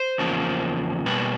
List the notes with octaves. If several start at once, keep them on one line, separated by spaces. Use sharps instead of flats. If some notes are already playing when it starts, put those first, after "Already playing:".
Already playing: C5
E2 C#3 F3 A#3
B2 G3 A#3 B4